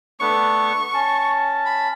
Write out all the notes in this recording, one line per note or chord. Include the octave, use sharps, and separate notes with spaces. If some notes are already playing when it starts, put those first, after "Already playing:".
A3 B3 D4 C#6
C#4 A5
B5